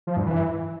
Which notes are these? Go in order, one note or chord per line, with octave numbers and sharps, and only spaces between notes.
F3
G2
E3